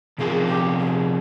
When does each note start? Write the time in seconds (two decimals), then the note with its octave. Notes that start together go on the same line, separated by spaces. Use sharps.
0.18 C3 F3 C4 F4 G#4 A#4
0.49 G4
0.80 G#4